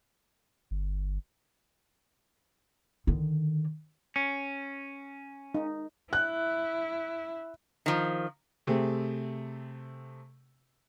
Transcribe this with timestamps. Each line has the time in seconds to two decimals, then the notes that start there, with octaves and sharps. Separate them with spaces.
0.71 G1
3.07 D3 D#3
4.16 C#4
5.55 D#4
6.13 E4 F#6
7.86 D#3 F3
8.67 C3 A3 C4 G#4